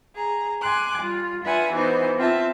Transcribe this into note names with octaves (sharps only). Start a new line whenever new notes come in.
G#4 A#5
G#5 C6 D6 F#6
G3 F4
D4 F4 B4 E5 F#5 G#5
E3 B3 D#4 F#4 B4 C5
C4 F4 E5 A5